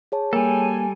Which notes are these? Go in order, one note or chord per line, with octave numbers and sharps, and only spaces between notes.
G#4 C#5 A5
G3 A#3 A4 G#5